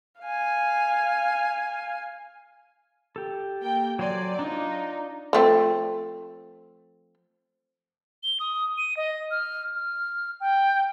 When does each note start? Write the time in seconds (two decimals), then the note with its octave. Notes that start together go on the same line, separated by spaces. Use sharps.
0.21 F5 G#5
3.16 G4 A4
3.62 A#3 G5
3.99 F#3 C5 D5 G#5
4.39 D4 D#4 F4
5.33 F3 A3 C4
8.23 G7
8.40 D#6
8.78 D#7
8.97 D#5
9.31 F6
9.75 F6
10.41 G5